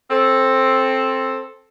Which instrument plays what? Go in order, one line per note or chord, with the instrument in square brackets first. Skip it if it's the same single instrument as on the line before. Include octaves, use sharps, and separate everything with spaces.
[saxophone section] C4 A4